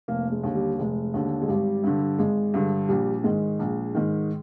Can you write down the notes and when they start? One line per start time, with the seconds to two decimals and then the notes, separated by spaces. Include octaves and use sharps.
0.08 F1 A#3
0.32 G#3
0.44 D#2 D3
0.55 G3
0.79 F1 G#3
1.14 D#2 D3
1.42 G#3
1.49 G#1 G3
1.84 G2 D3
2.19 G#1 G#3
2.54 G2 D3
2.88 A#1 G3
3.24 G#2 D#3 G#3
3.59 A#1
3.95 G#2 D#3